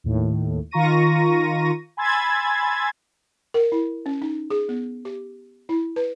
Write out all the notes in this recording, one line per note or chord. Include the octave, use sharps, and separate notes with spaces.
D#2 A2
D#3 F4 A#5 C#6 A#6 D#7
G#5 B5 C6 E6 G#6 A6
A#4
E4
C#4
D#4
G#4
B3
G4
E4
B4